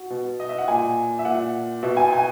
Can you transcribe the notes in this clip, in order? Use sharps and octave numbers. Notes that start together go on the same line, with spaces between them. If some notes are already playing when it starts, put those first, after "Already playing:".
Already playing: F#4
B2
D#5
E5
F#5
A#2 G#5
E5
A#2 F#5
B2 E5
G#5
G#5